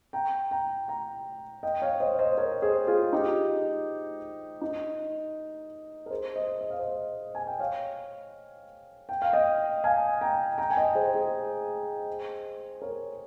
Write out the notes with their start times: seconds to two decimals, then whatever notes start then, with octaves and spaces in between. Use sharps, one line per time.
0.13 G5 A#5
0.51 G5 A#5
0.88 G5 A#5
1.63 D#5 G5
1.82 C#5 F5
2.00 C5 D#5
2.19 C5 D#5
2.37 A#4 C#5
2.62 G#4 C5
2.87 F4 G#4
3.13 D#4 G4
4.61 D#4
6.06 A#4
6.10 G#4 C5
6.36 C5 D#5
6.61 D#5
6.70 F5
6.79 C5 D#5
7.35 G#5
7.47 G5
7.59 C#5 F5
9.09 G5
9.22 F5
9.33 D#5 G5
9.84 F5 G#5
10.21 G5 A#5
10.58 G5 A#5
10.70 G#5
10.77 D#5 G5
10.95 G#4 C5
11.14 G#4 C5
12.82 A#4 C#5